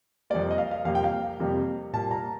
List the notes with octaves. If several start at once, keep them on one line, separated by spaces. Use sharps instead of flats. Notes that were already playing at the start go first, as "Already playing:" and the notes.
F2 C3 G3 A#3 D5
D#5
F5
F5
F2 C3 G3 A#3 F5
G5
F5
F2 C3 G3 A#3
A#2 G3 A#3 A5
A#5